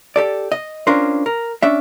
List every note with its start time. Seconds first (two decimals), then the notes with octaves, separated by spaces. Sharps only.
0.16 G4 A4 D5
0.52 D#5
0.87 C#4 D4 F4 A#4 C5
1.26 A#4
1.63 C#4 D4 E5